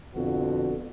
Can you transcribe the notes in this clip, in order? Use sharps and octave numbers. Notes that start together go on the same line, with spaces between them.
F2 B2 D3 B3 F#4